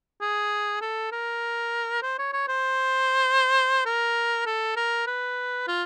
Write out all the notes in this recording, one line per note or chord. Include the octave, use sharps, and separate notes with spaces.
G#4
A4
A#4
C5
C#5
C#5
C5
A#4
A4
A#4
B4
F4